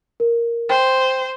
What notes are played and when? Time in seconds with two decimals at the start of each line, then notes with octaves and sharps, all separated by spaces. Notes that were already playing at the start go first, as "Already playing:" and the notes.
0.20 A#4
0.70 C5 G5